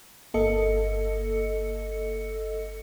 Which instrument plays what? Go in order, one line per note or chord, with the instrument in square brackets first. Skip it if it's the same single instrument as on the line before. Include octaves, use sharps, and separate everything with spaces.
[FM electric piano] G1 A#3 A4 D#5 C#7